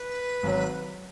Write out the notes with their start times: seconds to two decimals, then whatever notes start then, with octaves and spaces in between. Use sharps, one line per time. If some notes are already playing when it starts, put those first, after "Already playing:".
Already playing: B4
0.43 G#1 F#3